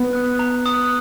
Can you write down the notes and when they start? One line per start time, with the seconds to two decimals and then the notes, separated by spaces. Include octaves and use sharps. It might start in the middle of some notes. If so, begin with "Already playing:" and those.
Already playing: B3
0.13 D#6 F#6
0.39 A#5
0.66 D#6 F#6